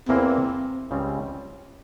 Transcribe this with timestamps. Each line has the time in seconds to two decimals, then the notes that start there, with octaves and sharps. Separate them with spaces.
0.09 E2 E3 A#3 C4 F4
0.91 C#2 C#3 G3 C4